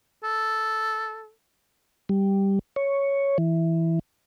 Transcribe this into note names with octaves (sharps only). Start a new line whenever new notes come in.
A4
G3
C#5
E3